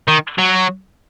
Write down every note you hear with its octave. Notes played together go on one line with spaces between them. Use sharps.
D#3
F#3